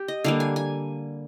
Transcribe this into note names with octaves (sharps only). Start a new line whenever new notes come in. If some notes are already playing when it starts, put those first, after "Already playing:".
Already playing: G4
D#5
D3 G3 A#3 F5
G#5
G#5